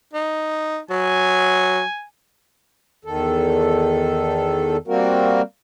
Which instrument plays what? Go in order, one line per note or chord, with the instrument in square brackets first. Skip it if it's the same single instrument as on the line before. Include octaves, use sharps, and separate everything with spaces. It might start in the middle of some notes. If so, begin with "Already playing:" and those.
[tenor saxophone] D#4
[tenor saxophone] F#3 [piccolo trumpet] G#5
[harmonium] E2 D#3 A4
G3 A#3 C4 F#4 A#4